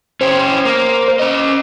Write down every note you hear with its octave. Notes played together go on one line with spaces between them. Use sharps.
C#4 G4 C5
A#3
C#4 D#5